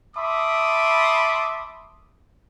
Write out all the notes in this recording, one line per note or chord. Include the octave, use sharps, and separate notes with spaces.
E5 A5 B5 C6 D6 D#6